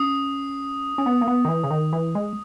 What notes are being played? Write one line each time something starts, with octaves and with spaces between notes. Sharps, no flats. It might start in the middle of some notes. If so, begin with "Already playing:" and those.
Already playing: C#4 D#6
C#4
B3
A#3
B3
D#3
E3
C#3
D#3
E3
G#3